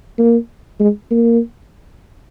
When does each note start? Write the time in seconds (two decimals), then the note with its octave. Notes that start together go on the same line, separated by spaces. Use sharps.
0.18 A#3
0.80 G#3
1.11 A#3